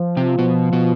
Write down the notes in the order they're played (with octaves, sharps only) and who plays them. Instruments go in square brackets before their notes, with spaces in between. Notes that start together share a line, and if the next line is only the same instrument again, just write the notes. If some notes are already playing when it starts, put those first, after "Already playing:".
Already playing: [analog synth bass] F3
[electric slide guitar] C3 C4
B2 B3
B2 B3